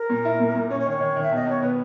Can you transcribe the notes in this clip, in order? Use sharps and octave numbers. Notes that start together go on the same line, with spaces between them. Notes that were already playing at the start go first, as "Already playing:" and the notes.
Already playing: A#4
A#2
E4
A#2
A#2
C#4 C#5
C#5
D#3
C#5
D#3
D#3
E5
B2 D#5
B2 C#5
B3 B4